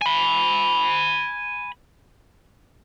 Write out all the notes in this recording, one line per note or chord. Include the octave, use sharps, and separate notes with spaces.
G#5 B5